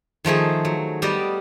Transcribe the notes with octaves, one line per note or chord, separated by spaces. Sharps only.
D#3 F3 A3 G#4
F#3
G3 B3 G4 D5 D#5